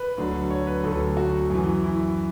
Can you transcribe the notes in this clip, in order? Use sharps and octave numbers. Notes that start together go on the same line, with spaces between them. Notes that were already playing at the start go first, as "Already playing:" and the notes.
Already playing: B4
D2 D3 F#3
C#5
B4
D2 D3 F#3 A4
F#4
F#2 E3
E4